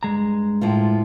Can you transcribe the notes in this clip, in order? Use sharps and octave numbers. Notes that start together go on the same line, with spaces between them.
G2 G#3 A#5
A2 F3 F4